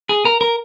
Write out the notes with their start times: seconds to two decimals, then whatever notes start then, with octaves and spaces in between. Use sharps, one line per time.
0.09 G#4
0.25 A#4
0.41 A#4